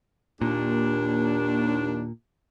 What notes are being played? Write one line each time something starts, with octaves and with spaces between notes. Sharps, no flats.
D#2 A#2 D4